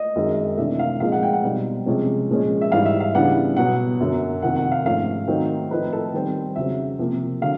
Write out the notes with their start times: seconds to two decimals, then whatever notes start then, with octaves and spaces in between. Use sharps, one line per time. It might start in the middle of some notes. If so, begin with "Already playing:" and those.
Already playing: D#5
0.16 F#2 D#3 G#3 C4
0.58 C3 E3 A3 D4 E5
0.79 F5
1.00 A#2 F3 G#3 C4 D#4 F5
1.12 F#5
1.23 G5
1.33 F#5
1.43 B2 G3 C4 D#4
1.86 C3 F3 G#3 C#4
2.30 A#2 F3 G#3 C#4
2.61 E5
2.71 G#2 E3 G3 F5
2.85 E5
3.00 F5
3.15 C#3 E3 G3 B3 D4 F#5
3.57 B2 F#3 B3 F#5
4.01 F#2 D3 F#3
4.42 F2 C3 D#3 F#5
4.56 F#5
4.72 F5
4.85 G#2 F3 A3 C#4 F5
5.28 D#3 F#3 A3 C4 D#4
5.71 A2 F3 A3 C4 D#4 B4
5.93 A4
6.13 D#3 G3 C4
6.56 F2 C#3 F#3 E5
6.99 C3 F3 A#3
7.42 D3 F#3 F5